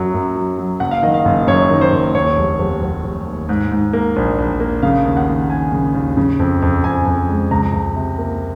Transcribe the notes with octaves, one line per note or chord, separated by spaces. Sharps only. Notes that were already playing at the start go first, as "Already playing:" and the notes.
Already playing: F#2 F#3
F#2
F#3
F#3
F#1 F#5
F5
D#3 D#5
F5
F#1
F#2 C#5
D#3
C5
F#1
D#2 C#5
F1
F1
F1
F1
D#2
G#2
G#2
A#3
A#1
A#1
A#3
C#3 F5
D#2
F#5
D#2
D#2 G#5
C#3
D#2
C#3
F2
F2
F2 G#5
F2
G#3
C#2 A#5
C#2
C3
A#3